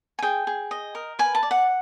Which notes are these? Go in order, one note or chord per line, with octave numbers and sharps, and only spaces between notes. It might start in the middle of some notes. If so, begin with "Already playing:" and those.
G#5
G#4 G5
G#4
D#5
A#4
B4 G#5
A5
D5
F#5